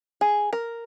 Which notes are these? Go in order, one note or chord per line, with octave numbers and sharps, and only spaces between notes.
G#4
A#4